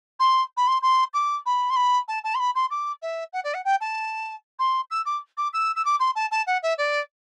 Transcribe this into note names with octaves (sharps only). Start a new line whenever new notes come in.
C6
B5
C6
C6
D6
B5
C6
B5
A5
A5
C6
B5
C6
D6
E5
F#5
D5
F#5
G5
A5
C6
E6
D6
D6
E6
E6
D6
C6
A5
A5
F#5
E5
D5